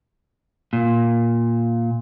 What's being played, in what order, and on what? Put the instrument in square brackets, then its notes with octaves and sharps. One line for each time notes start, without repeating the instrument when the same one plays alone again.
[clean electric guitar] A#2